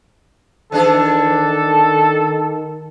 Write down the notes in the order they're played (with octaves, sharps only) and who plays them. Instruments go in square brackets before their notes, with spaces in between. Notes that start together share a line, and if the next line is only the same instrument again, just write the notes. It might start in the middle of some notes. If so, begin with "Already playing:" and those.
[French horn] D#3 [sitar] E3 D4 G#4 [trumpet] A4